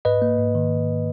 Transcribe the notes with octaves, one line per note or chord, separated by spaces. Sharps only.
G#2 B4 D#5
A#3
G#2
D#3